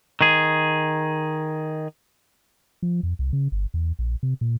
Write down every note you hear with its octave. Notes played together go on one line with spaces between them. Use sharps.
D#3 G#4
F3
F2
C2
C#3
G1
E2
A#1
C3
A#2